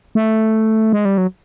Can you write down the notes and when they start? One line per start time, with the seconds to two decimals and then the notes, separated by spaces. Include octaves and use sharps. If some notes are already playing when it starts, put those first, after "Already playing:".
0.15 A3
0.92 G#3
1.05 G3
1.18 F#3